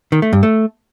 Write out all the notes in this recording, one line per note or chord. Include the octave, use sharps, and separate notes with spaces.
D#3
A3
G2
A3